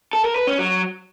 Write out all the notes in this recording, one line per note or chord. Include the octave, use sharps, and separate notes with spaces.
A4
A#4
B4
C#4
F#3